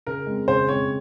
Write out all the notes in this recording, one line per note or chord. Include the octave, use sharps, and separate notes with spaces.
C#3 A#4
G#3 C4
C#3 C5
G#3 C4 C#5